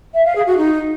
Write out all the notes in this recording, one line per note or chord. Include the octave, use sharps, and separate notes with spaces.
E5
F5
G#4
F#4
D#4